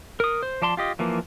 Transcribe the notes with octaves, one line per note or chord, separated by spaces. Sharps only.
A#4 D#6
C5
F3 D5 A5 C6
F4 G4 D#5
E3 F3 A#3